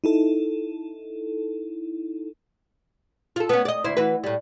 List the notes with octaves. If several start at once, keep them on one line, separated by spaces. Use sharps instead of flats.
D#4 E4 A4
F4 A4
B3 C#4
D5 D#5
D2 E4 C5
E3 F#4 B4
A2 G3